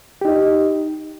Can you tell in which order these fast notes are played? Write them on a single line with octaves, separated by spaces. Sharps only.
G4 D#4 D#5